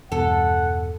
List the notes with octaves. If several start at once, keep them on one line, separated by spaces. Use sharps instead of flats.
E2 G2 B2 A4 F#5